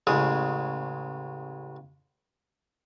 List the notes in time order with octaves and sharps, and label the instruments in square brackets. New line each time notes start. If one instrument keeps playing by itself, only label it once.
[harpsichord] A1 C#3 G#3 D#6